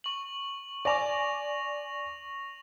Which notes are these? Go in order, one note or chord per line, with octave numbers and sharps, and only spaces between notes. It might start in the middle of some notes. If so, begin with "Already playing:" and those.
C#6 F#7
D5 G#5 C#6 D6 A#6 F7